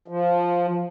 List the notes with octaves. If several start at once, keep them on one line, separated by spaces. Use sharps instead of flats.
F3